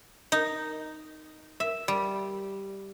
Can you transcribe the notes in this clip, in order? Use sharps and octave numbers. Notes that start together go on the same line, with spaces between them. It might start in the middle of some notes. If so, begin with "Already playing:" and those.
D#4
E5
G3